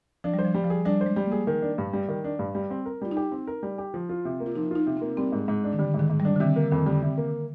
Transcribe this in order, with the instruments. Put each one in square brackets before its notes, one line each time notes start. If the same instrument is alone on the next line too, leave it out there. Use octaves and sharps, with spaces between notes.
[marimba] F3 [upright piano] D4
[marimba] G3 [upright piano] C5
[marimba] F3
[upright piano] G3
[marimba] F3
[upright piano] G#4
[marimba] G3 [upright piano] D4
[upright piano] C5
[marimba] G#3
[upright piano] G3
[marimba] A#3
[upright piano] G#4
D#3
D4
G2
G3
D#3
D4
G2
G3
C4
A#4
[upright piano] G3 [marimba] F4
[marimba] D#4
[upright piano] G4
C4
A#4
G3
G4
F3
F4
C3
A#3
[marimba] F4
[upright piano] F3 [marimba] D#4
[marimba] D#4 [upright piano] F4
[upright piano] C3
[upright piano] A#3 [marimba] C4
[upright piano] G3 [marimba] C4
[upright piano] G#2
G#2
D4
[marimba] D#3
[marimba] D3 [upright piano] G3
[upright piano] G#2
[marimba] D#3
[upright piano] G#2
[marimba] G3
[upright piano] D4
[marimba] D3
[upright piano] C3 [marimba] D#3
[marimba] D3 [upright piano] A#3
[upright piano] F2 [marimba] D#3
[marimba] D3 [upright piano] G3
[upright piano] C3
A#3